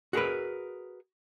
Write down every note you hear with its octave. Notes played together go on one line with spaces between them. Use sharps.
F#4 G#4 A#4 B4